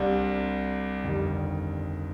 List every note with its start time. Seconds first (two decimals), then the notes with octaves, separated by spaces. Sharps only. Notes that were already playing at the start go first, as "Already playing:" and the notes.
Already playing: C2 C3 G3 D4
1.02 G1 F2 D#3 G3